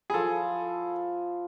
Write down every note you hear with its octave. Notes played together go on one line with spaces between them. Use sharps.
F3 E4 G#4 A4